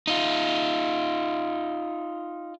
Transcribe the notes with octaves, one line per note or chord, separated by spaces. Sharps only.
D#4 F4